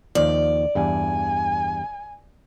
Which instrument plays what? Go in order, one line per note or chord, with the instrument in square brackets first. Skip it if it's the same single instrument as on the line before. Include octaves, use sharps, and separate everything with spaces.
[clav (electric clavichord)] D#2 D#3 F3 [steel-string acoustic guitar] D5
[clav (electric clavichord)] E2 G2 [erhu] G#5